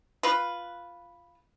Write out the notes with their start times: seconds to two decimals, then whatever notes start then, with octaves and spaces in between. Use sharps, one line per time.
0.23 F4 B4